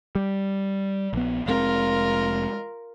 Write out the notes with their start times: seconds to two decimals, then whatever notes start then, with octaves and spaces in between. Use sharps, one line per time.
0.15 G3
1.13 A#1 B3
1.46 F1 G#3 C4 F4 A#4